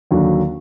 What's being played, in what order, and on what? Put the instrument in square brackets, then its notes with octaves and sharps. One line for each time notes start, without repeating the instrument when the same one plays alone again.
[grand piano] D#2 D3 F#3